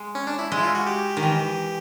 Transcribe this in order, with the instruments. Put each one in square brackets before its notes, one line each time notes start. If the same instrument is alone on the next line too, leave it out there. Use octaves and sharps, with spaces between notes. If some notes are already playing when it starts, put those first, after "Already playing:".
Already playing: [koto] G#3
[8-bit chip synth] C#4
D4
E4
[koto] G#3
[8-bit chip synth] E4
F4
F#4
G4
[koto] D#3
E3